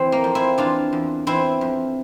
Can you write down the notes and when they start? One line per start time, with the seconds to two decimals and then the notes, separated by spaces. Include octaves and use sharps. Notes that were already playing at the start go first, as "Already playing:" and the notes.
Already playing: E3 C4
0.12 A#3
0.24 F2
0.35 C4 E4
0.58 E3 D4 F4
0.93 E2
1.27 E3 C4 E4
1.61 F2